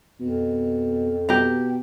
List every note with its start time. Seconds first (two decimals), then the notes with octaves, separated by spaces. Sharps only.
0.20 F2 B2
1.29 B2 G4 A#5